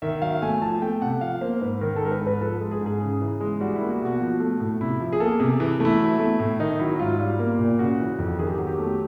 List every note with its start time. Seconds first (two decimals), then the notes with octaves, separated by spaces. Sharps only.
0.02 D#3 E5
0.22 F#3 F5
0.42 A3 G#5
0.62 F3 A5
0.82 A3 G5
1.02 C3 F#5
1.21 F3 F5
1.41 A#3 C5
1.61 G#2 B4
1.81 D#3 A#4
1.96 A4
2.02 G#3 A#4
2.12 B4
2.22 G#2
2.27 B4
2.41 F3 A4
2.57 G#3 A4
2.71 G#4
2.81 G#2
2.86 G#4
3.01 C#3
3.21 E3
3.40 G#3
3.61 G3 F#4
3.76 E4
3.81 A#3
3.90 F#4
4.01 B2 F#4
4.21 F3
4.40 A3
4.60 A2
4.81 C3 E4
5.00 F3
5.13 G#4
5.20 A#3 A4
5.39 C3 G#4
5.60 E3
5.80 A3 E4
6.00 F#3
6.19 A3
6.39 A2
6.59 D#3 D#4
6.79 F#3 E4
6.99 G#2 F4
7.19 G3 F4
7.39 A#3
7.59 A#2
7.79 C#3 F#4
7.99 E3
8.19 F2
8.39 D#3 G#4
8.48 G4
8.57 F#3 F#4
8.67 G4
8.79 A3
8.87 G4